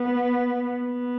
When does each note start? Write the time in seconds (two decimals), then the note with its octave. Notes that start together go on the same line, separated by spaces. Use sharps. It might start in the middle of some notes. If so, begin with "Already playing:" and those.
Already playing: B3
0.81 B3